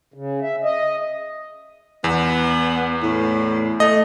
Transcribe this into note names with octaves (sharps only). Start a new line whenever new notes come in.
C#3
E5
D#5
E2 B3
A2
A3 D#5